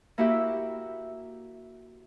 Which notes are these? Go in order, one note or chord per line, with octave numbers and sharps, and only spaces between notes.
A#3 E4 F#4 G4 E5